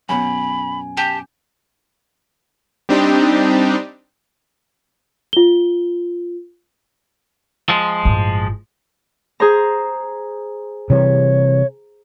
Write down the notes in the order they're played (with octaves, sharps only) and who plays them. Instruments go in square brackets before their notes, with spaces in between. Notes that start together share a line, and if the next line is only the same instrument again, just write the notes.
[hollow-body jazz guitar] F#2 B2 [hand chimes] G#5 [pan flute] B5
[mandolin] G4 [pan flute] A5
[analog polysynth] G3 C4 D4 D#4 G4
[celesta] F4 G7
[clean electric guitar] F3 G#3
[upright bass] G1 A2
[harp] G#4 C5 A#5
[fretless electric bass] C3 E3 G3 [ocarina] C#5